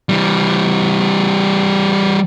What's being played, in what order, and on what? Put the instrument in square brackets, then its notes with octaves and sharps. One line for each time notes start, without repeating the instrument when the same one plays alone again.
[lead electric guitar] E3 G3